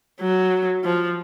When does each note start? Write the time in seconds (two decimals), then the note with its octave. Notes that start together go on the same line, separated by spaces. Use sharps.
0.21 F#3
0.84 F3